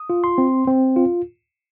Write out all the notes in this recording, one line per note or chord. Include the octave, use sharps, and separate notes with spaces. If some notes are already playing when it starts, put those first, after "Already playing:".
Already playing: D#6
F4
C6
C4
C4
F4